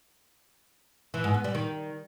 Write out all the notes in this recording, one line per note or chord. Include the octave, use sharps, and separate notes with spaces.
E3
G#2
B3
G3
D#3